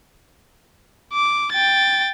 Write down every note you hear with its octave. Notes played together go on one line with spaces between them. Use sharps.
D6
G5 A6